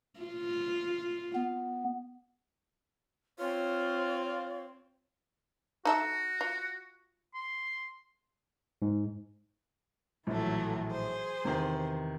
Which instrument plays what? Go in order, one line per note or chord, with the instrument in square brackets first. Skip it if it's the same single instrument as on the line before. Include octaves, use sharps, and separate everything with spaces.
[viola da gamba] F4
[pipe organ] B3
[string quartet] C4 [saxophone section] F4 [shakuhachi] C#5
[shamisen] D#4 A4 E5 [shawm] F#4
[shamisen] F4
[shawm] C6
[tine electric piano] G#2
[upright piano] A#1 A2 [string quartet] E3 F#3 A3
[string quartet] G#4 C5
[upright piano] E2 C3 D#3